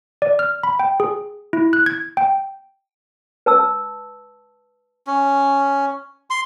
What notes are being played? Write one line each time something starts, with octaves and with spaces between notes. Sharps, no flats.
D5
F6
B5
G5
G#4
E4
F#6
G#6
G5
B4 A5 E6
C#4
C6